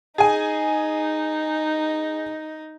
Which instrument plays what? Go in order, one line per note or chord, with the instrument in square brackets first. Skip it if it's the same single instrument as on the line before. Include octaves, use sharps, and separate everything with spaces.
[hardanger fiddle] D#4 [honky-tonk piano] G#4 G#5